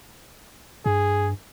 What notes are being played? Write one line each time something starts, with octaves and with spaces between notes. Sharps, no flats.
G2 G#4